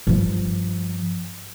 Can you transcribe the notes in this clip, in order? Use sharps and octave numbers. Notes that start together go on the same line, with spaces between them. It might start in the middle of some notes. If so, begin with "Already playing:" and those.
G2 F3